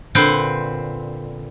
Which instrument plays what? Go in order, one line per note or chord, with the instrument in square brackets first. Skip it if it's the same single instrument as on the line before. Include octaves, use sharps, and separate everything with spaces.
[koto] A#2 D3 C4 B4 C5